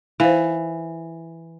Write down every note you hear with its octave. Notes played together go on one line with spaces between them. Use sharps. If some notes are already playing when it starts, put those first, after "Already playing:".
E3 C5 F5